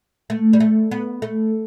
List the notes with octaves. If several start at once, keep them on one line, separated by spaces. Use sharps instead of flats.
A3
G3
A3
B3
A3